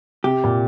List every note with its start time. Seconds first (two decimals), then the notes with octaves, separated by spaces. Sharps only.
0.24 C3 G4
0.44 A#2